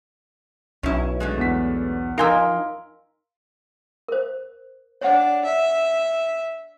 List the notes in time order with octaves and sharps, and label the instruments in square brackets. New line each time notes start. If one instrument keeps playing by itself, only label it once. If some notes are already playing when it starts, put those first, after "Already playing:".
[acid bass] B1 [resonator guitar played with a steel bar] C#4 E4
[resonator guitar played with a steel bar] A2 D3 G#3
[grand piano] E2 B6
[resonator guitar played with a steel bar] F3 G#5 A#5 [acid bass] D#4 [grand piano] A#4 [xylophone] F5 C6 E6
[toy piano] A#4 C5
[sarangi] D4 [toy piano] C#5 F#5
[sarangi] E5